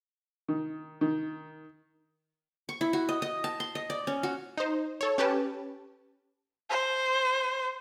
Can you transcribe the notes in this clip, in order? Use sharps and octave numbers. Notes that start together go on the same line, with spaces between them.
D#3
D#3
C#6
E4
F#4
D#5
D#5
A5
C6
D#5
D5
C#4
F#4
D#4 C5
A4 C#5
C#4 G4 B4 A5
C5